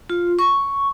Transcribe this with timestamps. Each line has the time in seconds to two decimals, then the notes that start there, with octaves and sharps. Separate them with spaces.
0.10 F4
0.39 C#6